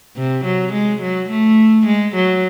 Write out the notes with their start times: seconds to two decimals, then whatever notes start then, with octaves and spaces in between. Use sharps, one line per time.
0.16 C3
0.45 F#3
0.73 G#3
1.02 F#3
1.30 A3
1.87 G#3
2.15 F#3